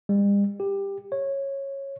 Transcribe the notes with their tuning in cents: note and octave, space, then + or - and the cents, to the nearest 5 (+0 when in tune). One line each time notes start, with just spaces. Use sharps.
G3 +45
G4 +15
C#5 -15